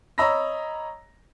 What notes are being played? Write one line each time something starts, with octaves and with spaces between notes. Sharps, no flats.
C#5 D#5 A#5 B5 E6 A#6